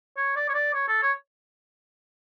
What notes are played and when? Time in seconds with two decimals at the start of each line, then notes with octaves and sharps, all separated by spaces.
0.17 C#5
0.36 D5
0.49 C#5
0.54 D5
0.74 C#5
0.88 A4
1.02 C#5